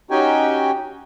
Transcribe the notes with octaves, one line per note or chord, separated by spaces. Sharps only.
C#4 D#4 F#4 G4 G5 G#5